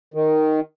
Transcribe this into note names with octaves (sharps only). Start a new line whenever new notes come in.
D#3